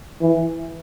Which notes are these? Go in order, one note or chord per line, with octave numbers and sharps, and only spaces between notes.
E3